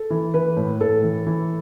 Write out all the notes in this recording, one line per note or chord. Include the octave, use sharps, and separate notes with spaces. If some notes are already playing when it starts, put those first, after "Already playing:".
Already playing: A4
E3
E3 B4
A2
A2 A4
E3
E3